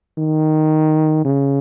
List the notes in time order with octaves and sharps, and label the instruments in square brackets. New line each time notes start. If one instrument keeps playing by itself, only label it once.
[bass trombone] D#3
C#3